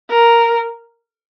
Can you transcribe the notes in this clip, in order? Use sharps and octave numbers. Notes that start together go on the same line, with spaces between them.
A#4